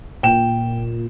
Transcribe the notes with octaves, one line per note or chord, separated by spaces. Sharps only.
A#2 G5 E7